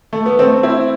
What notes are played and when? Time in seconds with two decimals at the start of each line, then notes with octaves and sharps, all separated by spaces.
0.13 A3
0.26 B3
0.39 A3 C4
0.63 C4 E4